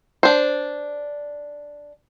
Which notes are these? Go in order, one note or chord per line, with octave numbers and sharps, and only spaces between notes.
D4 C5